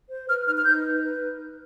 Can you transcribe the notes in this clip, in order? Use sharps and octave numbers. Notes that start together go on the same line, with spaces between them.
C5
B4 F6
D#4 F6
F6
D#4 G6
B4
B4